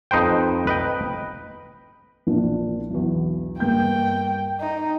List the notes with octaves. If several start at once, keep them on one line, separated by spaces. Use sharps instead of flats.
F2 D#4 B4 C5 G5
B4 D#5 G5
A#1 A#3 D4
B1 E2
G2 A#3 G5 G6
D#4